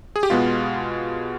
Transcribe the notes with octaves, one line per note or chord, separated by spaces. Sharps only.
G#4
G4
B2 G#3 B3 F4